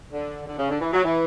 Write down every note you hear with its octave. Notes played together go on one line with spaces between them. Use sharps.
D3
D3
C#3
D3
E3
F#3
E3